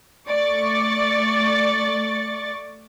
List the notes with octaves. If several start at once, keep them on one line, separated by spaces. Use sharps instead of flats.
A3 D5 C#6 A6